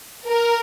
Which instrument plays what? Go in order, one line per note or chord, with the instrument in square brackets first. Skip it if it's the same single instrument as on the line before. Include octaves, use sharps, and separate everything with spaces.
[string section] A#4